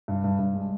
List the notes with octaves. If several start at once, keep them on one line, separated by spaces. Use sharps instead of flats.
G2
G2
G2
G#3